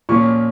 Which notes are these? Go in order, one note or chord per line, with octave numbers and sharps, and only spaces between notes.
A#2 F3 A#3 C#4 C#6